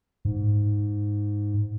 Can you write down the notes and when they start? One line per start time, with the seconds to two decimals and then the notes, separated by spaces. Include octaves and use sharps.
0.25 G#2